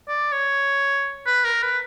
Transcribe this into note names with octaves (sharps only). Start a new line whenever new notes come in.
D5
C#5
B4
A#4
B4